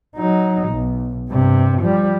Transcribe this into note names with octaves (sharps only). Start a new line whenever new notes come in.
F#3 D#4
B1
G2 C3
F3 G3